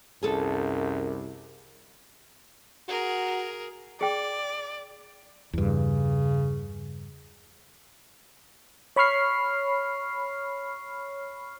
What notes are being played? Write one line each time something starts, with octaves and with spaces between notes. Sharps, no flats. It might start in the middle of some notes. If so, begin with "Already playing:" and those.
C2 F#2 G#4 A4
F#4 G#4 A#4
G#4 D5 G5
E2 G2 C#3
C#5 B5 C#6 F6 C7